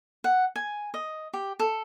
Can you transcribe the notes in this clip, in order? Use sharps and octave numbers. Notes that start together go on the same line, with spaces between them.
F#5
G#5
D#5
G4
A4